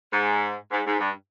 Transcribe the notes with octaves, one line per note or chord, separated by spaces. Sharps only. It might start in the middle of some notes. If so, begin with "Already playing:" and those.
G#2
G#2
G#2
G2